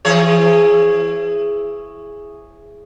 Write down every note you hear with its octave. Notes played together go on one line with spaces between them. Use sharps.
E3 G#4 C#5